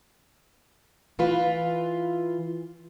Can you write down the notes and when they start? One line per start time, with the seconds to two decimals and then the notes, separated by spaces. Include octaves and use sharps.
1.19 E3 F4 B4